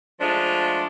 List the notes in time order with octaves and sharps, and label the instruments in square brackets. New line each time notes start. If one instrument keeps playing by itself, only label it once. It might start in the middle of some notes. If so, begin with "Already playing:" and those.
[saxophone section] F3 G#3 A3 D4 F4